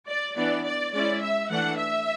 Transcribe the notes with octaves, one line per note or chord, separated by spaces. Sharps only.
D5
E3 B3 D4 D5
D5
G#3 C#4 E4 D5
E5
E3 A3 D4 F#5
E5